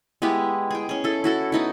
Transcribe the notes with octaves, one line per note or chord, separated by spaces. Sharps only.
G#3 B3 E4 G4
G#4 G5
C#4 G#4
E4 A4
E4 F#4 A4
B3 D#4 E4